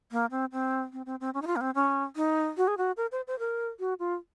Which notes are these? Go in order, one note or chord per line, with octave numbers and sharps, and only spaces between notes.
A#3
C4
C4
C4
C4
C4
C#4
D#4
F4
A#3
C4
C#4
D#4
F#4
G#4
F#4
A#4
C5
C5
A#4
F#4
F4